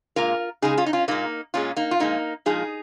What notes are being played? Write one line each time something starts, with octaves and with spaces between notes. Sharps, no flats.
A#2 G#3 F4 A#4
C#3 G#3 D#4 G#4
C#4 F4
D#4
C#4 F4
A#2 G#3 A#3 D#4
A#2 G#3 C#4 F4
A#3 D#4
F4
A#2 F3 G#3 A#3 D#4
A#2 F3 G#3 D#4 G#4